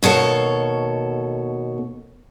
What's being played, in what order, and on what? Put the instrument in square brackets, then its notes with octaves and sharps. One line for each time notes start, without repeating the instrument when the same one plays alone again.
[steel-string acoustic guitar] D#2 B2 A4 C#5